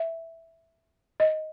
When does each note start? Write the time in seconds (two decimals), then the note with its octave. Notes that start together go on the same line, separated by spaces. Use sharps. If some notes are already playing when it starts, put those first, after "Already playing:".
Already playing: E5
1.20 D#5